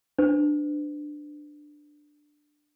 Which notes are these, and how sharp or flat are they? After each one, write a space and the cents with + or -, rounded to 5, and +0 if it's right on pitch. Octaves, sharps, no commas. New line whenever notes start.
D4 +10 B4 +40